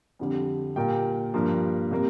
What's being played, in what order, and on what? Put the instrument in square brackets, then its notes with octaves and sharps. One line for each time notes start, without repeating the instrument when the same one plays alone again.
[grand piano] F2 D3 G3
A#2 G3 A#3 G5
G2 F3 A#3
C3 G3 A#3